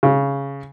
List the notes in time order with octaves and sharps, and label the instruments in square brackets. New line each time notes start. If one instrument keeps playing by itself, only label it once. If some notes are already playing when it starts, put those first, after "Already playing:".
[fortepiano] C#3